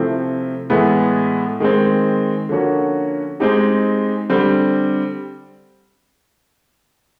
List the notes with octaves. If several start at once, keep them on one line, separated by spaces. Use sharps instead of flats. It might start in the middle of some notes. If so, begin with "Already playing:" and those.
Already playing: C3 F3 A3 C4 E4
A2 E3 G#3 B3 E4
D#3 G#3 C4
D3 F3 A#3 C#4 F#4
G#3 C4 D#4 G4
D3 G3 C4